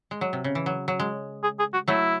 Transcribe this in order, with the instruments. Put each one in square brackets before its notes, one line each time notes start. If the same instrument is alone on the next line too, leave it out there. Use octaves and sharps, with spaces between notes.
[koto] G#3
F#3
C3
C#3
E3
F#3
F#3
G#3
[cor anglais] G#4
G#4
F#4
[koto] F#3 A3 [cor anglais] E4